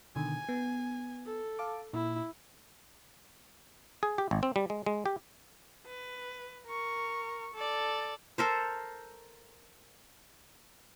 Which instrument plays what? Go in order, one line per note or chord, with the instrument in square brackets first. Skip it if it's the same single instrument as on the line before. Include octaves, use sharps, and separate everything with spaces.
[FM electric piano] B2 D3 D#3 [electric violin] G#5
[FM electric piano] B3
[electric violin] A4
[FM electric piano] F5 A5 D6
[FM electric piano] A#2 [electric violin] E4
[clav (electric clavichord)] G#4
G4
G#1
C4
G3
G#3
G#3
G4
[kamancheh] B4
A#4 C#6
A4 D5
[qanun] A4 A#4 C5